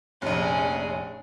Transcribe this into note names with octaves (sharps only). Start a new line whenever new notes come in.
F1 A#1 C#4 G#4